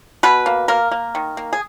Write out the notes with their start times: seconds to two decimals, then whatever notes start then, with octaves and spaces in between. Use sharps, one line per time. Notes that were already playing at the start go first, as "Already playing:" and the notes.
0.23 B2 B4
0.46 A#3
0.68 A#3 A#4
0.92 A#3
1.15 D#3
1.37 A#3
1.53 G#4